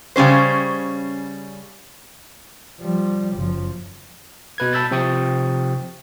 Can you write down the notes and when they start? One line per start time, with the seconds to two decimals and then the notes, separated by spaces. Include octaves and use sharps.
0.16 C#3 G3 C#4 C5
2.80 F3 G3
3.36 F#1 F3
4.58 B2 B4 G#6
4.73 A5 B5 E6 G6 A6
4.91 C3 F3 G5 C#6 D#6 A6